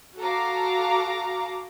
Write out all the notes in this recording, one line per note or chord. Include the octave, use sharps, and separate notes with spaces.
F#4 A4 F5 A#5 D6